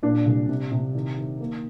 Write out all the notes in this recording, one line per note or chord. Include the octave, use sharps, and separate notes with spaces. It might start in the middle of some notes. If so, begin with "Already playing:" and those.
A#2 D4
C2
C3
C3
D#3
D#3
A#3